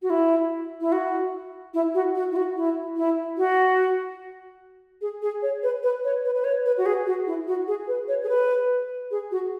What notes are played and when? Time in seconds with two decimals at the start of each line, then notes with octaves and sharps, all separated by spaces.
0.02 F#4
0.10 E4
0.81 E4
0.92 F#4
1.74 E4
1.94 F#4
2.15 F#4
2.32 E4
2.36 F#4
2.56 E4
2.97 E4
3.38 F#4
5.01 G#4
5.22 G#4
5.43 C#5
5.63 B4
5.83 B4
6.04 C#5
6.24 B4
6.35 B4
6.44 C#5
6.66 B4
6.78 F#4
6.86 G#4
7.06 F#4
7.27 E4
7.47 F#4
7.68 G#4
7.88 B4
8.08 C#5
8.23 G#4
8.29 B4
9.11 G#4
9.31 F#4